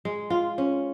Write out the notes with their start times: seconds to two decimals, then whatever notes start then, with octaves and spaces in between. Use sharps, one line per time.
0.05 G#3
0.30 F4
0.58 C#4